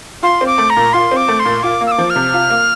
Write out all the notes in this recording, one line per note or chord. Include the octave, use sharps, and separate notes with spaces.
F4 C6
C4
D6
A3
A#5
A#2
F4 C6
C4
D6
A3
C6
A#2
F4 D6
A#3
E6
D6
F3
F6
C3
F4
A#3